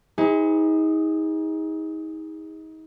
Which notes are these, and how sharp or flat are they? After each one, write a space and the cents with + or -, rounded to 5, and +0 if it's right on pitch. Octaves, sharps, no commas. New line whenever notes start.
D#4 +35 G#4 -25 C5 -40